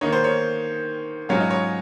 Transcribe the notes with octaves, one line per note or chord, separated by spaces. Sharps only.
D#3 A#3 D#4 C#5
C5
C#5
G#2 F#3 C#4 F4 C#5
D#5
C#5